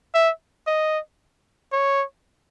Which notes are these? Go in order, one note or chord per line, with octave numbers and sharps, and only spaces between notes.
E5
D#5
C#5